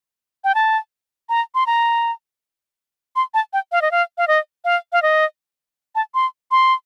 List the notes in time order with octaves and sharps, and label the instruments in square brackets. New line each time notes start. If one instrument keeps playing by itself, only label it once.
[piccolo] G5
A5
A#5
C6
A#5
C6
A5
G5
F5
D#5
F5
F5
D#5
F5
F5
D#5
A5
C6
C6